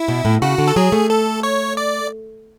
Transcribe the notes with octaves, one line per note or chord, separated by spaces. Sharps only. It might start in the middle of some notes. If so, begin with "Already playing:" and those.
Already playing: E4
B2
A2
C#3 F#4
D3
A4
F#3 G#4
A3
A4
C#5
D5